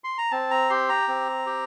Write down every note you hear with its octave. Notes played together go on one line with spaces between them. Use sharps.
C6
A#5
C4 A5
A#5
G4 C6
A#5
C4
G4